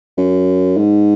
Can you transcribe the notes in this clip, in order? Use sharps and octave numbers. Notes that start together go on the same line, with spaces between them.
F#2
G#2